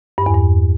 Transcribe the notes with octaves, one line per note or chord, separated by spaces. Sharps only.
G2
E2
G2